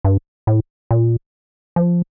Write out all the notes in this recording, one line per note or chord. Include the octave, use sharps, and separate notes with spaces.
G2
A2
A#2
F3